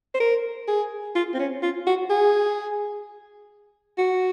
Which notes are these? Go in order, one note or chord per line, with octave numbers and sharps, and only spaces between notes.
C5
A#4
G#4
F4
C4
C#4
F4
F#4
G#4
F#4